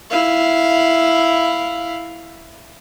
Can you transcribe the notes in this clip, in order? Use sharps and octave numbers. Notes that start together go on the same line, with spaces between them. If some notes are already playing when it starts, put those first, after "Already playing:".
E4 F5